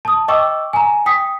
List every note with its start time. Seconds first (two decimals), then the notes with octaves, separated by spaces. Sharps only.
0.05 A5 D#6
0.28 D#5 G5 C#6 D6 E6
0.73 G#5 A#5
1.06 G5 D#6 B6